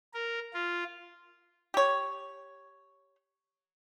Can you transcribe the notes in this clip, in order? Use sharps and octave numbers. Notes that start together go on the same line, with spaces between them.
A#4
F4
G4 C#5